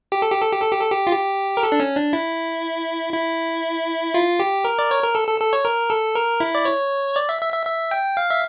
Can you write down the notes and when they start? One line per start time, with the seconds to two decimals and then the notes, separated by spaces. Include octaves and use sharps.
0.12 G4
0.22 A4
0.32 G4
0.42 A4
0.52 G4
0.62 A4
0.72 G4
0.81 A4
0.92 G4
1.07 F4
1.12 G4
1.57 A#4
1.63 A4
1.72 D4
1.80 C#4
1.96 D4
2.13 E4
3.13 E4
4.14 F4
4.40 G4
4.64 A#4
4.79 D5
4.91 C#5
5.03 A#4
5.15 A4
5.28 A4
5.40 A4
5.53 C#5
5.65 A#4
5.90 A4
6.15 A#4
6.40 E4
6.55 D5
6.65 C#5
7.16 D5
7.29 E5
7.41 E5
7.54 E5
7.66 E5
7.91 G5
8.17 F5
8.31 E5